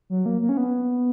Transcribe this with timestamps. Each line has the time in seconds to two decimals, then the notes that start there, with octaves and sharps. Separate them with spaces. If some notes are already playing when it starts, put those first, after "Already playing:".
0.10 F#3
0.26 A#3
0.41 A#3
0.49 C#4
0.57 B3